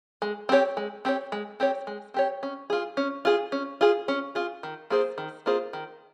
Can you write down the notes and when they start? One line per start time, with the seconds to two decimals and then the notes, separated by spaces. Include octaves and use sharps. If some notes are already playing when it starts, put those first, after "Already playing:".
0.22 G#3
0.49 C4 G4 C#5
0.77 G#3
1.05 C4 G4 C#5
1.32 G#3
1.60 C4 G4 C#5
1.87 G#3
2.14 C4 G4 C#5
2.43 C#4
2.70 F4 G#4
2.97 C#4
3.25 F4 G#4
3.52 C#4
3.81 F4 G#4
4.08 C#4
4.35 F4 G#4
4.63 D#3
4.90 A#3 F4 G#4 C5
5.18 D#3
5.46 A#3 F4 G#4 C5
5.73 D#3